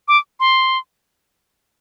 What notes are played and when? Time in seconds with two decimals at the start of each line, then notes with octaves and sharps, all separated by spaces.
0.08 D6
0.40 C6